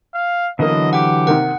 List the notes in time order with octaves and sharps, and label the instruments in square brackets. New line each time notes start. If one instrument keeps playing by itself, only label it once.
[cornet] F5
[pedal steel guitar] D3 E3 F#3 [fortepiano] A#3 B3 [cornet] D#5
[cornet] G4 [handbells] F#5 D6
[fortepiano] C3 D#3 A#3 [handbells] F#5